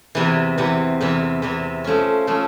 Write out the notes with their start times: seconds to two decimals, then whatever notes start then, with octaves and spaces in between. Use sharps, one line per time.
0.15 E2 C3 E3
0.58 E2 C3 E3
1.01 E2 C3 E3
1.42 E2 C3 E3
1.84 F3 A3 C#4
2.27 F3 A3 C#4